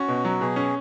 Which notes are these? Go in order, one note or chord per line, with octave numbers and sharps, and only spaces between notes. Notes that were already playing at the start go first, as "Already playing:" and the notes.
Already playing: C#4 F#4
B2
F#3
B2 G#4
C#4